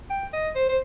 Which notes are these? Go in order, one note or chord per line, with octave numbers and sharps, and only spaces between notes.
G5
D#5
C5
C5